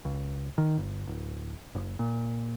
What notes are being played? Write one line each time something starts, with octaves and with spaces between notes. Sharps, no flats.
C#2
D#3
G1
D1
F#1
A#2